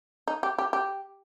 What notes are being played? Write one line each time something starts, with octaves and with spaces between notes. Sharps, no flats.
D#4
G4
G4
G4